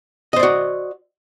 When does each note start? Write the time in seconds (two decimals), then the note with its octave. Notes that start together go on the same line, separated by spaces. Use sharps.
0.33 D#5
0.36 C5
0.40 D5
0.43 F#4